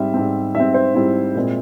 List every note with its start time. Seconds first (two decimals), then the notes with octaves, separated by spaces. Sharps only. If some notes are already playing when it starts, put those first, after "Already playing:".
Already playing: G#2 G3 C4 E5
0.14 G#2 G3 C4
0.55 G#2 G3 C4 E5
0.74 C5
0.95 G#2 G3 C4 E4
1.35 A#2 G#3 C4